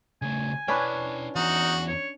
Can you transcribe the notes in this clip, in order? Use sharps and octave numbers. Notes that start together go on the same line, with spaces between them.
C#3 A3 G#5
C#4 D4 E4 B4 G5
E2 E3 D#4 F#4
C#5